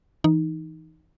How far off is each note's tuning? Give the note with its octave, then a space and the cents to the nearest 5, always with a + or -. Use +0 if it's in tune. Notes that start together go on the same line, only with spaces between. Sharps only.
E3 -10 D#4 +0